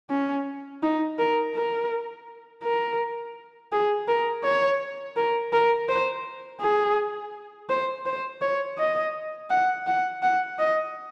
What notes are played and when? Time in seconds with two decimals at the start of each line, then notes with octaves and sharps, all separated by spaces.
0.10 C#4
0.83 D#4
1.18 A#4
1.55 A#4
2.63 A#4
3.72 G#4
4.08 A#4
4.44 C#5
5.16 A#4
5.53 A#4
5.89 C5
6.61 G#4
7.69 C5
8.06 C5
8.42 C#5
8.78 D#5
9.50 F#5
9.87 F#5
10.23 F#5
10.59 D#5